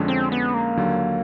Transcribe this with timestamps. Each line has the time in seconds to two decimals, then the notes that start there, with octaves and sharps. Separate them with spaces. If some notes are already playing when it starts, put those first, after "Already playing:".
Already playing: F2 D3 F3 G#3 C#4
0.08 C4
0.32 B3
0.54 A#3
0.77 D#2 D3 F#3